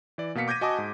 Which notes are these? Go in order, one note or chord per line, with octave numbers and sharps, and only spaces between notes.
E3 D5
B2 A#3 F5 B6 C#7
D6 G6 G#6 A#6 D#7
F#4 D#5 G#5 A5 D6 D#6
G#2